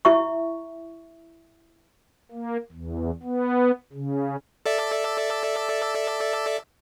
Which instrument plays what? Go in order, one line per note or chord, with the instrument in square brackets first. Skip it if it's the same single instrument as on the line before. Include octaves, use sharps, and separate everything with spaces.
[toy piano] E4 E5 C#6
[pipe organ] A#3
E2
B3
C#3
[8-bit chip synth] A4 D5 E5